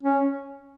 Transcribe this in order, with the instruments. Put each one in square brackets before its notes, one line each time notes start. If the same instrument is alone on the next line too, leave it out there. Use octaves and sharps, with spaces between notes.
[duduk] C#4